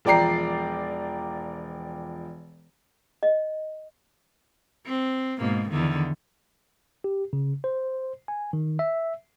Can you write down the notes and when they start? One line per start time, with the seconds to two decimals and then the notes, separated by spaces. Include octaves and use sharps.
0.05 E1 F3 D5 G5 A#5 C7
3.23 D#5
4.87 C4
5.39 G#2 B2 A#3
5.70 E2 D3 D#3
7.04 G4
7.33 C#3
7.64 C5
8.28 G#5
8.53 D#3
8.79 E5